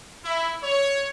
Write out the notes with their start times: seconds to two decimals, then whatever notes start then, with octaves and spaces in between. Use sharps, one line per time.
0.24 E4
0.61 C#5